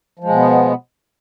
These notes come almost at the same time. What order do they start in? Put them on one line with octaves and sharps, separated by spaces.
F3 G#3 B2 B3